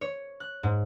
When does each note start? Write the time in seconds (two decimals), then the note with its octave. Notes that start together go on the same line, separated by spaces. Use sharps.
0.01 C#5
0.40 F#6
0.63 G#2